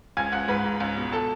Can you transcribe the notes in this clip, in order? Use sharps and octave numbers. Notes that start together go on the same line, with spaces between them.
C#2 G#5 G#6
C#2 F#5 F#6
G#2 B4 B5
G#2
C#2
B2
A4 A5